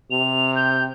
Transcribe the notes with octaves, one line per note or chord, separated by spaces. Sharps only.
C3 F7
G6